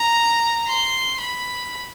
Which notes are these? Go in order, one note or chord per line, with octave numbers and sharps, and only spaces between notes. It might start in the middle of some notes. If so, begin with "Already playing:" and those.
Already playing: A#5
C6
B5